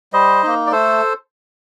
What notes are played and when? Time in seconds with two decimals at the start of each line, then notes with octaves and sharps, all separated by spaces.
0.13 G3 C5 D#5
0.43 A#3 D#4
0.67 D5
0.72 A3 A4 C5